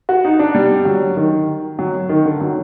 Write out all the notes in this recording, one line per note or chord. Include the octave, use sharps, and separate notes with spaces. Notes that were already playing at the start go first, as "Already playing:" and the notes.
F#4
D#4
D4
G3
F#3
D#3
F#3
D#3
D3
F#3